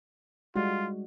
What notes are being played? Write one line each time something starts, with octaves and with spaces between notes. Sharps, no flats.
G3 G#3 F4 F#4